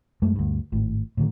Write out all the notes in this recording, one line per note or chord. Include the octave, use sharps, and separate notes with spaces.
F#2 G#3 A3
D2 G2
G#1 A2
A2 D3 D#3